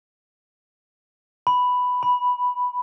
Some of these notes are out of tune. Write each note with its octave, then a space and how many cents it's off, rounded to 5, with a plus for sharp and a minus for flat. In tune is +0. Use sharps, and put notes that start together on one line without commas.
B5 +5
B5 -5